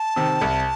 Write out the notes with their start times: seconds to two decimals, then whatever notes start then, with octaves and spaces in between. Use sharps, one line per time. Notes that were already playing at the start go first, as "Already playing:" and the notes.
Already playing: A5
0.16 C3 D#3
0.42 C2